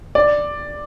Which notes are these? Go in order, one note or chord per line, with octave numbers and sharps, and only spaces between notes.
D5